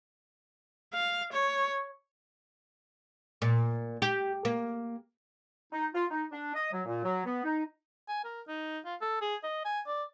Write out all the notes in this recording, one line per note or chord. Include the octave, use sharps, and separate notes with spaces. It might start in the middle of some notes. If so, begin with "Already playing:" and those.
F5
C#5
A#2
G4
A#3
D#4
F4
D#4
D4
D#5
F#3
A#2
F#3
B3
D#4
G#5
A#4
D#4
F4
A4
G#4
D#5
G#5
D5